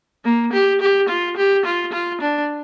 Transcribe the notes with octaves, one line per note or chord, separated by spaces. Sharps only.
A#3
G4
G4
F4
G4
F4
F4
D4